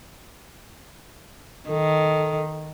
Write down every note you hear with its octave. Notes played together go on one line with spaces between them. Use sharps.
D#3 A4